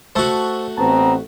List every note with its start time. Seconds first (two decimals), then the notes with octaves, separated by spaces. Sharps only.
0.16 A3 F#4 C5 A5 E6
0.78 A1 B3 C4 A5 A#5